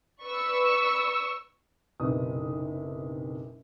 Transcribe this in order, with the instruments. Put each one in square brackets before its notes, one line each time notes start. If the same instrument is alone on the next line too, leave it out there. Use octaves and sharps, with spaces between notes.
[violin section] B4 D5 C#6 E6
[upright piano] F#1 B1 C3 B4 D#6